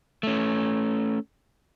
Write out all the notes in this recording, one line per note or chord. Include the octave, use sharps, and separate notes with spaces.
A3 C#4